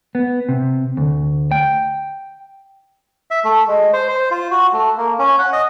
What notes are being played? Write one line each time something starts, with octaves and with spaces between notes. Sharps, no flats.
B3
C3
D2
G5
E5
A3
G#3
C5
C5
F4
F#4
A3
A#3
C#4
F#5
D#5